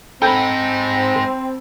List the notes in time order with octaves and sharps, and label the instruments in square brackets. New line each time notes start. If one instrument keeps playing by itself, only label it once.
[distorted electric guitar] G#3 D#4 [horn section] C4 [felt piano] A4 B5 [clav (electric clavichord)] G5